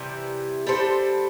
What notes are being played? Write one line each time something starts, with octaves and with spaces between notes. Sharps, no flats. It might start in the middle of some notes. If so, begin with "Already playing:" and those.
Already playing: C3 E3 G3
G3 D4 A4 C5